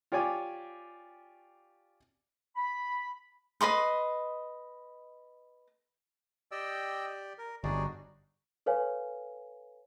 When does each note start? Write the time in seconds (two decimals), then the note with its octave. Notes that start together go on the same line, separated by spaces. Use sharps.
0.12 F4 G4 C#5 D5 G#5 D6
2.56 B5
3.61 B4 D#5 B5 C6
6.52 G4 D5 D#5 G5 E6
7.38 A#4
7.64 G1 G3 D4 D#4 F#4 G#4 D5
8.66 A4 B4 C#5 F5 G#5